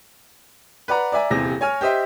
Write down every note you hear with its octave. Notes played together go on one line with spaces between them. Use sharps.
B4 D5 F#5 A#5
D5 E5 G#5 A#5
D#1 E2 C3 A#6
C#5 G#5 F6
G4 C5 D#5 E5 G5